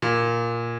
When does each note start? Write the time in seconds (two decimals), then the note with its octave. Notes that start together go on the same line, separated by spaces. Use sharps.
0.02 A#2